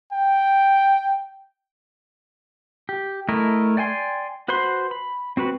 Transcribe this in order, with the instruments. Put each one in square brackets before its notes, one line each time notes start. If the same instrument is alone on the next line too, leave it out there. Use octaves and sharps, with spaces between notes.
[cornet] G5
[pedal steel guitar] G4
A3 E4 A#4 D#5
D5 G5 G#5 C6
F#4 B4 C5 B5 C6
B5
C4 F#4 B4 B5